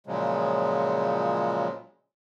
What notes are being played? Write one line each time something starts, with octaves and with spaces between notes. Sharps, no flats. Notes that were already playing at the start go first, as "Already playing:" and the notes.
A#2 C#3 F3 F#3 G#3